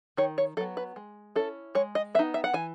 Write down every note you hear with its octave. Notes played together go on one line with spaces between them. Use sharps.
D#3 C#5
C#5
F#3 B3 A4
B4
G#3
C#4 E4 A4
G#3 C#5
D#5
B3 D#4 E5
E5
F#5
E3 G#5